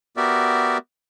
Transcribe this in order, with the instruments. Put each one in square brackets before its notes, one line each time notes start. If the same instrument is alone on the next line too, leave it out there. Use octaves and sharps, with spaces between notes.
[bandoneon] B3 F#4 G4 A#4 D5 E5